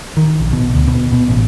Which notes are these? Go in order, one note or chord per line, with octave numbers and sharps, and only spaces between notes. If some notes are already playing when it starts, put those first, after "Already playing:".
D#3
A#1
B2
D2
B2
B2
A1